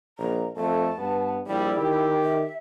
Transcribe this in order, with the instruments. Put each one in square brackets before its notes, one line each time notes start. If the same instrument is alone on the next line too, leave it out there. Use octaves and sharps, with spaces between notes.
[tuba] A#1 [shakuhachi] A#5
[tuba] F2 [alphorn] A3 [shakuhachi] A5
[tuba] G2 [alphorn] B3
[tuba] A#1 [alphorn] G3 [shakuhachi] E4
[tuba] D#3 [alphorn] G4
[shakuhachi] E5